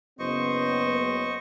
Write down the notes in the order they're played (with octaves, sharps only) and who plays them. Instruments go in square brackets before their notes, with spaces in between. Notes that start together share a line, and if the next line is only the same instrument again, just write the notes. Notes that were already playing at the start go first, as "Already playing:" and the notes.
[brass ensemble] F#1 B3 [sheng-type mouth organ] C5 D#5 C#6